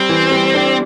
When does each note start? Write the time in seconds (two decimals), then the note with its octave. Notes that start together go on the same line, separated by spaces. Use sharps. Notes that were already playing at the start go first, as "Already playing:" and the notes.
Already playing: G3 C4
0.09 E3
0.32 G3
0.55 D4